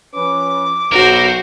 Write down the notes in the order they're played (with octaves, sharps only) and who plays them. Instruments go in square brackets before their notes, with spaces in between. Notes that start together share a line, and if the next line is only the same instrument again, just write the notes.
[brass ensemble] F3 C#4 B4 [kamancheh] D6
[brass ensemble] B1 [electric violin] F#4 C5 [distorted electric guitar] A#4